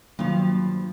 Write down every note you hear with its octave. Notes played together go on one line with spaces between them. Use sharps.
G2 D#3 F3 F#3 A#3